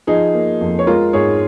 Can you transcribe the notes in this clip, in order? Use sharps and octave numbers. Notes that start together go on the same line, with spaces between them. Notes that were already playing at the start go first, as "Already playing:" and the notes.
F3 D#4 G#4
A#3
F2
C#5
G#3 F4 A#4
G#2 G#4 C#5